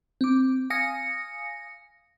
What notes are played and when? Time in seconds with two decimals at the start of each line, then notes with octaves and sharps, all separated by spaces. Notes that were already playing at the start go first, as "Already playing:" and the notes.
0.21 C4 D6
0.70 F5 G#5 D#6 A#6 C#7